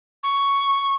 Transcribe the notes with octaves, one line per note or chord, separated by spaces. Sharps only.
C#6